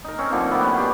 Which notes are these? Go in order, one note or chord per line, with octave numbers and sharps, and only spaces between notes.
D#4 A#4
C4 C#4
D3 F3 A#3 C4
A2 B3 B4 G5
B3 C#4 G4
B2 G4 C6